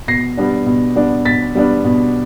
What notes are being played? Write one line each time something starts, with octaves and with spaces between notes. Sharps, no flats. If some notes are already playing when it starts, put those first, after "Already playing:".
B2 A#6 C7
G3 B3 D4
B2
G3 B3 D4
B2 A6 B6
G3 B3 D4
B2